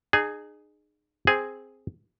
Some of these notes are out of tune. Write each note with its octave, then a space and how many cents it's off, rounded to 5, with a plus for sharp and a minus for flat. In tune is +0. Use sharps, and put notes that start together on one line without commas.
D#4 -40 G#4 +0
C4 +0 G#4 +0